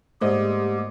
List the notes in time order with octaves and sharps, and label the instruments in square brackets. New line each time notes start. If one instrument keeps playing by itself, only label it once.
[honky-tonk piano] G#2 [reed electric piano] A3 A#3 D#5 [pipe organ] G4 [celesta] C5 D5